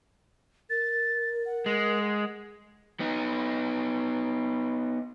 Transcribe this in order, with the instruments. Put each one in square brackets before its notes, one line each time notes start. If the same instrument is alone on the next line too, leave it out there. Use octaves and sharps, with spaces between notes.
[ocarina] A#4 [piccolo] A6
[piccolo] F#5
[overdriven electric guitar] G#3
[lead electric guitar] B3 D#4